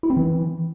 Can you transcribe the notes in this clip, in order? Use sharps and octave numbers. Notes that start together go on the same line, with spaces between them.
E4
C4
E3